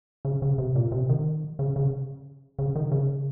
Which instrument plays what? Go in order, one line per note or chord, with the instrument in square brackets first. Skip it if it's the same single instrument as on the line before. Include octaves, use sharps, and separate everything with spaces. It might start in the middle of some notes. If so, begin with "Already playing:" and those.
[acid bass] C#3
C#3
C3
A#2
C3
D#3
C#3
C#3
C#3
D#3
C#3